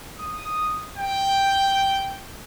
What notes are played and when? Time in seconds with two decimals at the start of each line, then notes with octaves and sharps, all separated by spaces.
0.18 D#6
0.97 G5